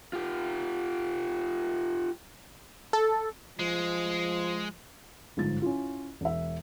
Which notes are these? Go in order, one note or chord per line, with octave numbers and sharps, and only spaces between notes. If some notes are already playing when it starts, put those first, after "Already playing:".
F4 G4
A4
F3 G#3
G1 G#2 F3 A6
C#4 E4 F4
E1 E5